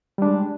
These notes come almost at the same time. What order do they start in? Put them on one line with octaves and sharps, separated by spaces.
G3 D4 G#3